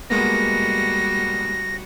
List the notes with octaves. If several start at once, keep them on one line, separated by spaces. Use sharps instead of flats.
G3 G#3 A#3 B3 F#4 A#6